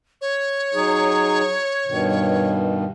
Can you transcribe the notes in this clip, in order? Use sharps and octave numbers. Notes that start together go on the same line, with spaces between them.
C#5
F#3 D#4 G#4
G2 B2 D#3